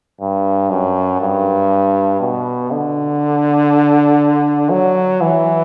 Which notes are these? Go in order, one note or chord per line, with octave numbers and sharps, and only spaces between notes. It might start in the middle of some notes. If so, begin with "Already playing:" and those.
G2
F#2
G2
B2
D3
F#3
E3